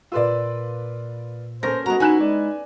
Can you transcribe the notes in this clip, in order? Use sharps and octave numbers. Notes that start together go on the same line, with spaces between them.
A#2 F4 B4 D5 C6 E6
A#3 C#4 A4 A#4 C5 A#6
G#3 B3 F#4 A#5
D#4 E4 G#5 F#6 E7
G#3 D5